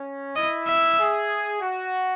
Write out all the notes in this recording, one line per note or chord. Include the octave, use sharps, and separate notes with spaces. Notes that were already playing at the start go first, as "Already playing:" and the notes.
Already playing: C#4
E4 D#5
E5
G#4
F#4